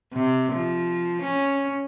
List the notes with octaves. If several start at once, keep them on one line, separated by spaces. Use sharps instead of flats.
C3
F3
C#4